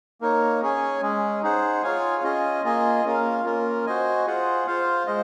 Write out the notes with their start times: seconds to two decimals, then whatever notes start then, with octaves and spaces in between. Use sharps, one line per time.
0.21 A#3 D#4 A#4 C#5
0.62 C#4 G#4 C#5 G#5
1.02 G#3 C#4 G#4
1.42 D#4 G#4 C5 F#5
1.83 F4 G#4 C#5 F5 G#5
2.23 C#4 F4 G#4 D#5 G#5
2.64 A#3 F4 G#4 D#5 G#5
3.04 A#3 C#4 F4 A#4 F5
3.45 A#3 C#4 F4 A#4
3.86 F#4 C5 D#5 G#5
4.26 F4 G#4 C5 F#5
4.67 F4 C5 F5
5.07 G#3 C5 D#5